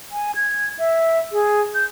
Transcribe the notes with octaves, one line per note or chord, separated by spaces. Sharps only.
G#5
G#6
E5
G#4
G6